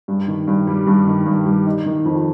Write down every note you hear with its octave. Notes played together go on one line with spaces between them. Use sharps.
G2
D#3
G2
G3
G2
D#3
G2
G3
D#4
D#3
F2